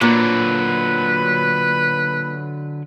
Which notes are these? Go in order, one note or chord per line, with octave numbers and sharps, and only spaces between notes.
A#2 D3 F#3 B4